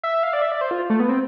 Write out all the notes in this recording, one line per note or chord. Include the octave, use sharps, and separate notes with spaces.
E5
F5
D5
E5
D5
C5
F4
A3
B3
C4